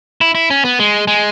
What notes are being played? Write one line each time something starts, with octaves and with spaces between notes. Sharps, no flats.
E4
E4
C#4
B3
G#3
G#3